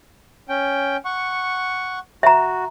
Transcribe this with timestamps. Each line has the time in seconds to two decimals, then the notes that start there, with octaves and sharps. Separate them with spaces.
0.49 C#4 G5
1.05 F#5 C#6
2.23 F#4 E5 A#5